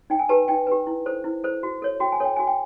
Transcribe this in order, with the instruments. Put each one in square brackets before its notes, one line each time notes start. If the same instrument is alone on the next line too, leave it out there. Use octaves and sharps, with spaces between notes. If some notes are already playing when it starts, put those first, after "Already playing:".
[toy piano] D#4 G5
G#5
G4 B4 A5
D#4 G5
G4 B4
E4
A4 C5
E4
A4 C5
F#4
A4 C#5
F#4 G5
G#5
A4 C#5 G5
F#4 G#5
G5